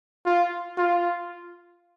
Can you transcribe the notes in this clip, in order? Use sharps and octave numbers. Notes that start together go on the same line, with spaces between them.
F4
F4